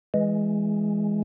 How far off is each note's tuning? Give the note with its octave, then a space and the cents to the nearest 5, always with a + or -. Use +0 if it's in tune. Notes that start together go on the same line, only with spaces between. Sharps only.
E3 +0 G#3 +0